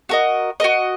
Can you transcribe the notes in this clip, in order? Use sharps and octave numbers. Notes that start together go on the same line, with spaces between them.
F#4 A#4 D#5
F#4 A#4 D#5